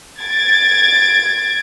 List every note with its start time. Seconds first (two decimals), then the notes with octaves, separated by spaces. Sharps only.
0.20 G#6 A6 D7